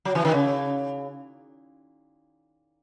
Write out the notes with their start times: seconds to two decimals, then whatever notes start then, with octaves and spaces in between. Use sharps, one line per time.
0.05 F#3
0.15 E3
0.25 D#3
0.34 C#3